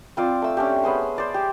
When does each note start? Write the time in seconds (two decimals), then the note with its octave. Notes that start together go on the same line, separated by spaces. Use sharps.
0.17 C4 F4 D5
0.42 A3 E6
0.57 C#4 D4 G4
0.84 B3 C#4 G#4 C5
1.18 C5 D5
1.34 G4